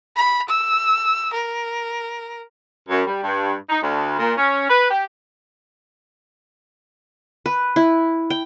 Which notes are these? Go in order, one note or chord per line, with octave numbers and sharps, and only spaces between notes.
B5
E6
A#4
F#2
G3
G2
D#4
D2
A#2
C#4
B4
G4
B4
E4
G5